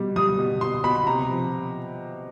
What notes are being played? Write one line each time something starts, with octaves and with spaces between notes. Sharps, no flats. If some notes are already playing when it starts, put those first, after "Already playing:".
Already playing: B2 G3
G3 D#6
B2
B2 C6
B2 B5
C3 A#5
F3